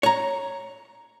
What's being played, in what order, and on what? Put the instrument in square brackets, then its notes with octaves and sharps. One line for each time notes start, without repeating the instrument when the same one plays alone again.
[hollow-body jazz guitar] C#5 A#5